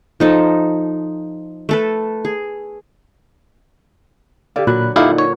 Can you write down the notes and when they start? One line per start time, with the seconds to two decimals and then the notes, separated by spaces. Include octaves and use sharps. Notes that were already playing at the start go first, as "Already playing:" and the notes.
0.20 F3 D#4 A4
1.69 A3 A4 B4
2.25 G#4
4.56 D3 G4 D5 F5
4.67 A#2 F#3 B5 F#6
4.96 A#2 D3 D#4 E4 G4 F5 F#5
5.18 C#5